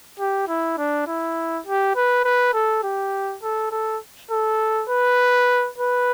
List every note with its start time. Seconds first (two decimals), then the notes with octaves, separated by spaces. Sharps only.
0.20 G4
0.48 E4
0.78 D4
1.07 E4
1.66 G4
1.96 B4
2.24 B4
2.54 A4
2.83 G4
3.43 A4
3.71 A4
4.31 A4
4.89 B4
5.78 B4